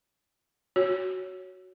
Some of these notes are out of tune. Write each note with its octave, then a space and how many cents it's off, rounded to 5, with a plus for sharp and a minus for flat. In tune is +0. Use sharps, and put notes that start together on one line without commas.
F#4 +5 C#5 +0